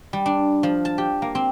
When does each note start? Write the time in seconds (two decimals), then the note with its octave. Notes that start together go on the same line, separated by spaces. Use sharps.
0.13 G3
0.26 D4
0.63 F3
0.85 A5
0.98 G4
1.22 A#3
1.35 C4